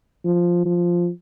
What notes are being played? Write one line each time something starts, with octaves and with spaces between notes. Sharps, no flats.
F3
F3